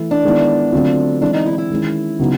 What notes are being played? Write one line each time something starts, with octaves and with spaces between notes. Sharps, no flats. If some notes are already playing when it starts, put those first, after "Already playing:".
Already playing: E3 A3 E4
D4
D#3 G#3 B3 E4
D3 F#3 A3 C4 F4
E3 G#3 C4 D4 E4
D#4
E4
D#4
E4
D#3 G#3 C#4
C#3 F#3 B3 D#4 F#4